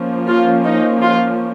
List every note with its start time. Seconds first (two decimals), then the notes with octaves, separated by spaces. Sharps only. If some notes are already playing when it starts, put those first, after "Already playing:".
Already playing: F3 A#3 C#4
0.28 F4
0.65 D#4
1.03 F4